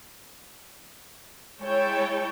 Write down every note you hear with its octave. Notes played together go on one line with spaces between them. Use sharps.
G#3 E4 C#5 G5 A5